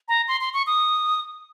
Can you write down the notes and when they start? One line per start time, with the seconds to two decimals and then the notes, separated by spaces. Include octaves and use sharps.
0.08 A#5
0.28 C6
0.41 C6
0.54 C#6
0.67 D#6